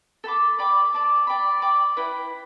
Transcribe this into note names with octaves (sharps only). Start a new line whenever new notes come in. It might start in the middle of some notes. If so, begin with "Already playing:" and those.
A4 G5 B5 D6
D5 G5 B5 D6
D5 A5 D6
D5 G5 B5
D5 G5 B5 D6
E4 B4 G5 B5